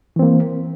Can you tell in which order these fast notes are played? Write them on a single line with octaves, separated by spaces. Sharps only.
E3 C4 A#3